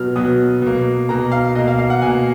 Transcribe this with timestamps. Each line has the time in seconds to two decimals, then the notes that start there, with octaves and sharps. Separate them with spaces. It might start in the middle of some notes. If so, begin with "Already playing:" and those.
Already playing: B2 F#3 B3 F6
0.16 B2 F#3 B3 D#6
0.62 B2 A#3
1.09 B2 A#3 A#5
1.32 F5
1.55 B2 A#3 D#5
1.68 F5
1.79 F5
1.90 F#5
2.02 B2 A#3 G#5